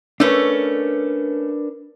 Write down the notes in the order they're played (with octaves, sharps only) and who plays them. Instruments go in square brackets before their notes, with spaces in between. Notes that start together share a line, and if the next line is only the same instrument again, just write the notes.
[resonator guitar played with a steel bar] A3 C#4 [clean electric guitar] D4 A#4 B4